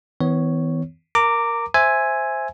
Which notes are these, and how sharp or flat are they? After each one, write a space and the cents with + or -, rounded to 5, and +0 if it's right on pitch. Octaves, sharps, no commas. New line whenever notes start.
E3 -40 B3 +30 C#5 +0
A#4 +0 A#5 -25 D6 +0
C5 +5 E5 +0 G#5 +0